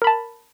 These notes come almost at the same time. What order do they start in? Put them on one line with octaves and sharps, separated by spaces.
A#4 B5 A5